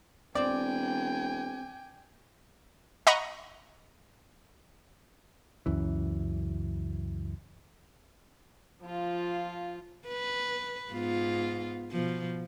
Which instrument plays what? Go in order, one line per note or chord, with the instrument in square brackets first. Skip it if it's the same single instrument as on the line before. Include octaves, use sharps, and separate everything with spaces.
[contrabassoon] E1 [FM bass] C4 [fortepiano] D5 [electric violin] G5 G#5
[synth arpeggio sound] D#5 F#5 A#5 B5 C#6
[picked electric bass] C#2 F#2 E3
[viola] F3 F4
[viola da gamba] B4
G#2 B3 F4
B2 F3